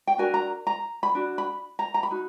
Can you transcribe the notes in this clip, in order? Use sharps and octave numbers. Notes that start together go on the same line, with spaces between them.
G5
D4 F#4 A#4 G#5
A#5
A#5
B5
D4 F#4
B5
A#5
A#5
B5
D#4 F#4